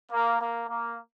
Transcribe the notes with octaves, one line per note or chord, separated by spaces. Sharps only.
A#3
A#3
A#3